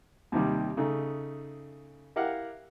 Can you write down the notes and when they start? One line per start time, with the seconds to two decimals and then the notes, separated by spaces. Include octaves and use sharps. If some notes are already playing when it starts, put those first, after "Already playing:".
0.32 D#2 C3 D#3 G3
0.77 C#3 A3 D#4
2.16 E4 G4 A#4 F5 F#5